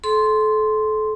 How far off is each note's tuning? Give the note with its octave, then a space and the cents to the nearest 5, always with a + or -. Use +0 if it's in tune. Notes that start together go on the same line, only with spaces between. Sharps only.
A4 -35 C6 +0